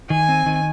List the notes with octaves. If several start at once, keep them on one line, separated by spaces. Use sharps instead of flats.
D#3 G#5
C4
D#3